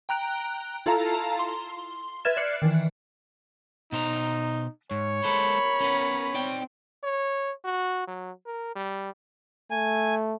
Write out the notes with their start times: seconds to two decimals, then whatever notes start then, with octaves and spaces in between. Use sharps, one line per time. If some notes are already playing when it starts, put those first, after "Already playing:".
0.09 G5 A#5 F#6 D7
0.86 E4 F4 A4 F5 A5 A#5
1.39 C6
2.25 B4 E5 F6 G#6 A6 E7
2.37 D5 F#6 C7 C#7
2.62 D#3 E3
3.92 B2 D#4 C5 A#5
4.91 G#2 C#5
5.24 G#3 A4 A#4 C5 B5
5.81 B3 C#4
6.34 C4 D#4 D5 G5
7.03 C#5
7.65 F#4
8.07 F#3
8.46 A#4
8.75 G3
9.71 A3 G#5